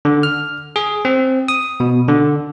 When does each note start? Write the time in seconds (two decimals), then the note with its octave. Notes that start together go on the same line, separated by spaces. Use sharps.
0.05 D3
0.23 F6
0.76 G#4
1.05 C4
1.48 D#6
1.80 B2
2.08 D3